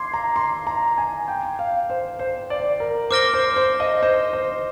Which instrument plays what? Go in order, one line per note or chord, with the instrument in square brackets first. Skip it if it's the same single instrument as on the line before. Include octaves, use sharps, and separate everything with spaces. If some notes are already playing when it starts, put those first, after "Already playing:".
Already playing: [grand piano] C6 [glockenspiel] D6 G#6 C7
[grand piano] A#5
C6
A#5
G#5
G5
F5
C5
C5
D5
A#4
[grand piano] C5 [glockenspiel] D6 F6 A#6 D7 G7
[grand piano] C5
C5
D#5
C5
C5